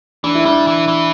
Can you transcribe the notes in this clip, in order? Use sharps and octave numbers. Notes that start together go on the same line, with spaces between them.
E3 D4
E4
G3 D4
E3
E3